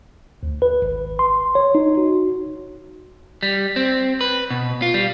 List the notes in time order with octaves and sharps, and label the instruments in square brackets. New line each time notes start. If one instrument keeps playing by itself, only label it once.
[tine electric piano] D2
B4
G#1
C6
C#5
D#4
F#4
[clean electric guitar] G3
C4
B4
B2
F4
G3